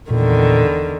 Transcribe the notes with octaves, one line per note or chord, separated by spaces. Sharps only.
E2 A#2 D3 D#3